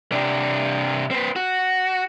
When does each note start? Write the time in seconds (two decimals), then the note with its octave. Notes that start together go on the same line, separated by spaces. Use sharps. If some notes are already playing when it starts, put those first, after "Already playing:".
0.12 C3 D4
1.11 C4 B4
1.36 F#4